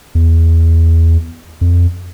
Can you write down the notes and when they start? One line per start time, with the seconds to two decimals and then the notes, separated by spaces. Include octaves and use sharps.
0.15 E2
1.61 F2